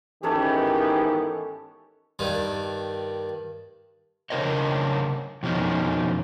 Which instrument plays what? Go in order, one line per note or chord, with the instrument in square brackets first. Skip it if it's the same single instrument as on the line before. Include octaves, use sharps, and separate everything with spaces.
[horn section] G#2 E3 B3 [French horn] D#3 [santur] C#4 A4 C#5 [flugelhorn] G4
[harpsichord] G2 D#3 G3
[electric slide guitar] C#3 D4 A#4 C5 C#5 D#5
F2 B2 D#3 C#4 D#4